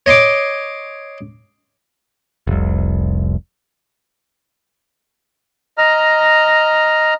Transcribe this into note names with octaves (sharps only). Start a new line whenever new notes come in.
C#5 D#5 C6 D6
F1 C2
D#5 A#5 F6